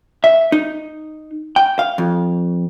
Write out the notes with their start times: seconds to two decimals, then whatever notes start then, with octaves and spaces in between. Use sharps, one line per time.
0.24 E5
0.52 D#4
1.56 G5
1.79 F5
1.98 F2